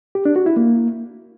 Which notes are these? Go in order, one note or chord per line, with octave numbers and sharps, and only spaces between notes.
G4
D4
F#4
E4
A#3